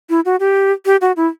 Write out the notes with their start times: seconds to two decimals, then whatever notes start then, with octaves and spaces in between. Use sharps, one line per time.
0.10 E4
0.25 F#4
0.40 G4
0.86 G4
1.01 F#4
1.17 E4